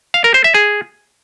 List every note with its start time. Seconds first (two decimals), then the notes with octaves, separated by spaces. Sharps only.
0.14 F5
0.24 A#4
0.34 C5
0.44 E5
0.54 G#4